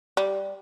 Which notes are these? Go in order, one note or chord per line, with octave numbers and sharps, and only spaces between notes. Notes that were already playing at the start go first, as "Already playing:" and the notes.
G3